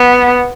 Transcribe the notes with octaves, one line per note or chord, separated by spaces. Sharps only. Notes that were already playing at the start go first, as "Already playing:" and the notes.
Already playing: B3